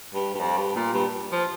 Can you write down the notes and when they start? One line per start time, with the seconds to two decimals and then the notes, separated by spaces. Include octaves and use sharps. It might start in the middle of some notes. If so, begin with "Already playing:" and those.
0.14 G2
0.34 G2
0.40 F2
0.58 G2
0.76 A#2
0.93 G2
1.32 F3